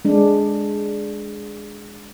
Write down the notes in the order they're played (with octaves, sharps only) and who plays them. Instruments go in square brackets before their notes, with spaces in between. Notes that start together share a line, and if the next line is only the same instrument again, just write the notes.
[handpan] G#3 D4